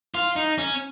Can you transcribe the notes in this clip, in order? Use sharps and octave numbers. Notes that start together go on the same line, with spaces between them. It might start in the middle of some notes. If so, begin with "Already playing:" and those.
F4
D#4
C#4